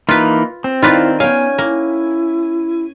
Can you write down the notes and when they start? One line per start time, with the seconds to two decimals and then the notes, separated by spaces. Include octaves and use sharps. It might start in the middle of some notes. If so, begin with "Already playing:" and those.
0.09 E3 A#3 D#4 F4 B4
0.64 C4
0.82 D#3 E4 F4 B4 D5 F5
1.20 B3 C#4 F5 G5 G#5
1.58 A#3 E4